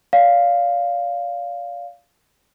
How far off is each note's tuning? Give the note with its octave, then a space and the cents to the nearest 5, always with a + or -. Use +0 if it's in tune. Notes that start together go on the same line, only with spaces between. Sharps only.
D5 -35 F5 +0